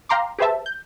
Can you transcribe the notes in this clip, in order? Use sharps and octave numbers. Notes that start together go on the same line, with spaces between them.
F5 G5 A#5 C6 D6
G4 G#4 B4 C5 E5 A5
G6